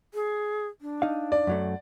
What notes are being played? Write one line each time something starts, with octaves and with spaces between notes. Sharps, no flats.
G#4
D4
D#4 F5
D5
F#2 F#3 A3